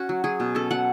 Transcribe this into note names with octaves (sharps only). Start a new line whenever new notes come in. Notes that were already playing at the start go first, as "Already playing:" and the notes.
Already playing: C#4 F#4
F#3
F#3 G#4
B2
C#4 A4
F#3 F#5